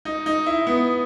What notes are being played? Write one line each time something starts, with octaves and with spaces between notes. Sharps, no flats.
D#4
D#4
E4
B3